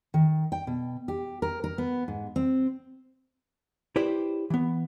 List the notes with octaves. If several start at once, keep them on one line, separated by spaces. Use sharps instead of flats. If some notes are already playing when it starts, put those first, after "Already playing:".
D#3
G5
B2
G4
A#4
A#4
B3
G#2
C4
E4 G4 B4 C5 D5
E3 B3